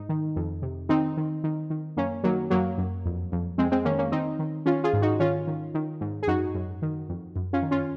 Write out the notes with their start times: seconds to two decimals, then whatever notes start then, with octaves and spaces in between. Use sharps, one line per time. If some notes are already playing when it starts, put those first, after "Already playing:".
Already playing: G#2 D#4
0.09 D#3
0.36 F2
0.62 C3
0.89 D#3 C4 D#4
1.17 D#3
1.44 D#3
1.70 D#3
1.97 F#2 A#3 C#4
2.24 D#3 F#3 A#3
2.50 F#2 F#3 A#3
2.78 F#2
3.05 F2
3.32 F2
3.58 F2 G#3 C4
3.72 G#3 C4
3.85 D#3 A#3 C#4
3.98 A#3 C#4
4.12 D#3 C4 D#4
4.39 D#3
4.66 D#3 C#4 F4
4.84 F4 G#4
4.93 G#2
5.02 D#4 F#4
5.20 D#3 C#4 F4
5.47 D#3
5.74 D#3
6.01 G#2
6.23 G#4
6.27 F#2 D#4 F#4
6.55 F#2
6.82 D#3
7.09 F2
7.36 F#2
7.53 C#4 F4
7.62 D#3
7.71 C#4 F4